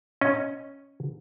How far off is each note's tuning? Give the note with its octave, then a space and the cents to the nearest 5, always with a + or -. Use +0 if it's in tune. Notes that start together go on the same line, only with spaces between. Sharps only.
C#4 +0 D#5 +0